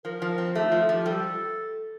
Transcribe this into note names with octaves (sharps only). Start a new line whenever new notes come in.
F3 A#4
F3
C4
A3 G4
D#4
F4
F3
F4
F3 G4
G3 A4